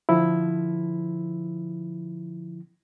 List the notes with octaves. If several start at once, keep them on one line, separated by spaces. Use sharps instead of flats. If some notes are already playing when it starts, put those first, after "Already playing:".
D3 F3 E4